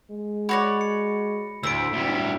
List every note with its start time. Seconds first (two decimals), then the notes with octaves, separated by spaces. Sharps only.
0.11 G#3
0.49 F#4 C#5 D5 B5 A#6
0.81 C#7
1.63 D2 A2 C5 E6 B6 D7
1.93 D2 G3